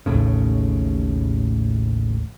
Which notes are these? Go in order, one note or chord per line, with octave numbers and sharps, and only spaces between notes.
A1 D#2 A2 C#3